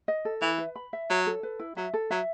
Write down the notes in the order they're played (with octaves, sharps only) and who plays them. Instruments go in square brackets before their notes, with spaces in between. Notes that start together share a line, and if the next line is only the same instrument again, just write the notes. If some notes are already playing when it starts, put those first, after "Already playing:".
[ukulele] D#5
A4
[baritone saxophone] E3 [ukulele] E5
[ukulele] B4
B5
E5
[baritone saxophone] F#3 [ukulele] C#5
[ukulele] A4
B4
E4
[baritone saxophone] F#3 [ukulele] E5
[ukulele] A4
[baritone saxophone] F#3 [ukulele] E5